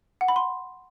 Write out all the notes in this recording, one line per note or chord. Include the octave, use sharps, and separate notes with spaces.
F#5
B5
C6